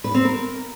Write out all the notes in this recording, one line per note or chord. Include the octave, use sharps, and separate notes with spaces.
B4
C4
A#4